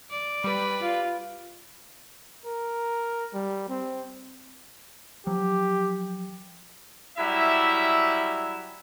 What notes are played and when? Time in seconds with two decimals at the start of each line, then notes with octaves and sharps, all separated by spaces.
0.10 D5
0.44 G3 B4
0.81 F4
2.45 A#4
3.34 G3
3.69 C4
5.27 F3 F#3 G4
7.18 F#3 G3 E4 E5